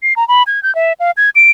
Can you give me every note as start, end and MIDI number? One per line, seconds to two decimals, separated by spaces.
0.03 0.13 96
0.16 0.26 82
0.28 0.43 83
0.47 0.62 92
0.63 0.74 91
0.75 0.93 76
1.00 1.11 77
1.17 1.30 92
1.36 1.51 98